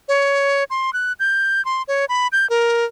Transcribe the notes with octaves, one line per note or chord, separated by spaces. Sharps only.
C#5
C6
F#6
G6
C6
C#5
B5
G6
A#4